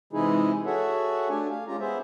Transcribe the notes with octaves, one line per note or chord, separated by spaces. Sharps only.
C3 E3 G#3 D#4 E4 G#4
F#4 G#4 A4 C#5 E5 F#5
A3 D4 G4 G#5
F5
G#3 C#4 F4 G4 A#5
B3 G#4 C5 E5